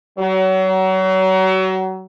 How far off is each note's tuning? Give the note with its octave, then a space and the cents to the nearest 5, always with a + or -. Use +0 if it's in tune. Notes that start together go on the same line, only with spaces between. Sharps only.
F#3 +30